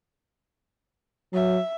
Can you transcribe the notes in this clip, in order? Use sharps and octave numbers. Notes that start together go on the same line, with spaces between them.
F#3 E5